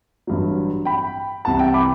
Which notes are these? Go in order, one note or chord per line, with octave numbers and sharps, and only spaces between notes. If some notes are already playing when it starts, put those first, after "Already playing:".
A1 G2 F#3
G5 B5
C2 C3 E3 F#5 A5
E5 G5
B5 D6